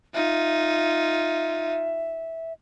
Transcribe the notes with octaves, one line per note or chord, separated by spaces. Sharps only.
D#4 F4 E5